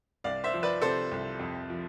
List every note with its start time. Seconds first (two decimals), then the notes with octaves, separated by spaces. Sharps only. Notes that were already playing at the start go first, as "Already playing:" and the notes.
0.24 C2 D5 F5
0.44 C5 E5
0.53 F3
0.63 B4 D5
0.82 C3 A4 C5
1.11 C2
1.39 F2
1.70 F3